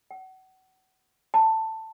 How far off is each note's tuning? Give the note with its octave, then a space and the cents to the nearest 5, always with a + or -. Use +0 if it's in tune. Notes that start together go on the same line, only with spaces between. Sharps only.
F#5 +30
A5 +10